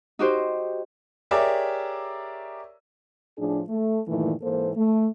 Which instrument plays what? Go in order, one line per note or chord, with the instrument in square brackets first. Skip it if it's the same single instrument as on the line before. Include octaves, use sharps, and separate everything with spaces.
[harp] D#4 F#4 G4 C5
[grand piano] G4 G#4 A#4 C#5 D5 E5
[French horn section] A2 F3 D4 G#4
A3
G2 A#2 D#3 E3 A3
G#2 E3 A#3 A4 C5
A3